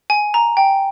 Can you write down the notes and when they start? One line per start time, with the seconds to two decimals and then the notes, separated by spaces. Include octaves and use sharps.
0.10 G#5
0.34 A#5
0.57 G5